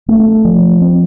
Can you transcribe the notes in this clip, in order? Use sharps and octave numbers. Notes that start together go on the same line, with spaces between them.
A3
F3
C4